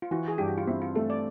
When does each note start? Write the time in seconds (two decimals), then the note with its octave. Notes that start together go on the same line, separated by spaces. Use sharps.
0.02 F4
0.11 E3 F#4
0.28 G#4
0.38 G2 G4
0.48 F#4
0.58 F4
0.67 C4 E4
0.82 F4
0.95 A3 A4
1.10 D5